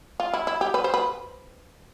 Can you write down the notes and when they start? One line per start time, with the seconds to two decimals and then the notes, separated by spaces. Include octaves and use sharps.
0.20 F4
0.33 E4
0.47 E4
0.61 G4
0.74 B4
0.84 C5
0.94 B4